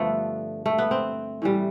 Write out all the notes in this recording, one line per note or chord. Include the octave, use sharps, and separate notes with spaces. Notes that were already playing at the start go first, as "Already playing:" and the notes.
Already playing: G2 D3 F3 A3 B3
A3
B3
C4
A2 E3 G3